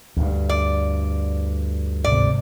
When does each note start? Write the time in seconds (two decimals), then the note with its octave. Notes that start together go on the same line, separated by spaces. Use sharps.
0.17 D2 G2
0.49 D5
2.04 G#1 C3 D5